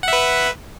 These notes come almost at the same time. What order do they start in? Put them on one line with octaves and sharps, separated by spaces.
F#5 E5 B4